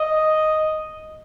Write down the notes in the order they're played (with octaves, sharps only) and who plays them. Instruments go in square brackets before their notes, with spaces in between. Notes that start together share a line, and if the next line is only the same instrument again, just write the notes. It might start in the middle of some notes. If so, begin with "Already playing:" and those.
Already playing: [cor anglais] D#5